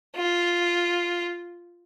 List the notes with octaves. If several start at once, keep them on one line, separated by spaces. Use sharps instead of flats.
F4